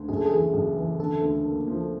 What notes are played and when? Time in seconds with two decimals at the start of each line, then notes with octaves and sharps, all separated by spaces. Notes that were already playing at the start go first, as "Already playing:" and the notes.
Already playing: D2
0.09 F#1 G#4
0.17 A4
0.26 G#4
0.31 E3
0.54 F#1
0.76 E3
0.99 D3 A4
1.21 D2
1.45 A#3
1.67 F3